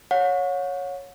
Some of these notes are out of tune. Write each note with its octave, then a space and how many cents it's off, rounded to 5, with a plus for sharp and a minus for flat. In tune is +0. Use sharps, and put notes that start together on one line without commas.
C#5 +0 F#5 -40